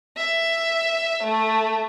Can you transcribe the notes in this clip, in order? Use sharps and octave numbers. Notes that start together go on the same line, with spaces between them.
E5
A3